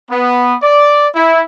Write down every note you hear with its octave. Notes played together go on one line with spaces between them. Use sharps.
B3
D5
E4